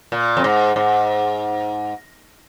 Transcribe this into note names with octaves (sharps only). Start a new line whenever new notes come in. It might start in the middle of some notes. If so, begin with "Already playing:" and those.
A#2
F2
G#2
G#2